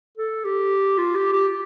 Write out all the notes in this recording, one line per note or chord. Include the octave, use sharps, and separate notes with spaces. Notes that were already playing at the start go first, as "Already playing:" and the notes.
A4
G4
F4
G4
G4